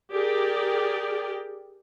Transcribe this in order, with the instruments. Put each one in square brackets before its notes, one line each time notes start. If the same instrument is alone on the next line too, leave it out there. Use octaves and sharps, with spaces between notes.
[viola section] G4 G#4 A#4 D5 G5